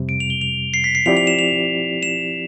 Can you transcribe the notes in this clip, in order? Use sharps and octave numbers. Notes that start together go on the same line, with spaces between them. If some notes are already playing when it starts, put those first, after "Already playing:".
Already playing: F2 C3 G3
D7
F7
G7
F7
C7
B6
C7
F3 C4 E4 G4 D5 F7
F7
E7
F7
E7